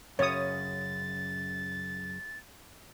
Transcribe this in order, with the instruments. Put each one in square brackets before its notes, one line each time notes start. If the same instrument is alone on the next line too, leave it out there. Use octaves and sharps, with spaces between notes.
[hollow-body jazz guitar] F#2 C#3 [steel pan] C#5 D#6 [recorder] A6